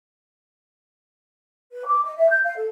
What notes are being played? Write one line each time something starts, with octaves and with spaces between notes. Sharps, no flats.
B4
D6
D#5
E5
G6
F5
A4